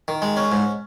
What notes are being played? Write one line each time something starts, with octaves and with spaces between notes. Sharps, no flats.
D#3
G#3
C#4
G#2